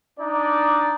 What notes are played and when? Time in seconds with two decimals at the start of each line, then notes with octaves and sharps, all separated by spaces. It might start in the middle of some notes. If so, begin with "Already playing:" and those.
0.20 D4 D#4 D5